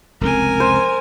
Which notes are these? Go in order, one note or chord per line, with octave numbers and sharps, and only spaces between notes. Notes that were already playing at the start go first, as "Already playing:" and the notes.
F1 C#2 C4 A#4 G#5
C5